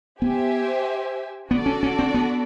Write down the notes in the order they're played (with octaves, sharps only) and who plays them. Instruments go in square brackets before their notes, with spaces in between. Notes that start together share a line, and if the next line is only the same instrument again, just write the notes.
[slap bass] B3 [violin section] G4 C5 E5 G#5
[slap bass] B3 [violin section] D4 F#4 A4 D5
[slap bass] C#4
C#4
C4
B3